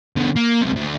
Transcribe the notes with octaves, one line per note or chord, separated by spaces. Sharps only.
B2 D3
A#3
C#2 C3
D2